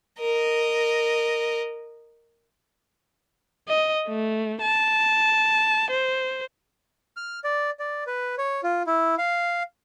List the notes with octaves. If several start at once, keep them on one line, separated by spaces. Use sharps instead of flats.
A#4 D#5
D#5
A3
A5
C5
F6
D5
D5
B4
C#5
F4
E4
F5